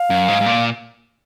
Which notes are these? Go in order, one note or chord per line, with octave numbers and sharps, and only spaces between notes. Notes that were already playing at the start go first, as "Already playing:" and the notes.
Already playing: F5
F#2
G#2
G#2
A#2